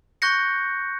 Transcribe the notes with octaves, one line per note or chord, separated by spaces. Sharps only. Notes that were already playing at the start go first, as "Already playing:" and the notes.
C#6 F#6 G6 A#6 C#7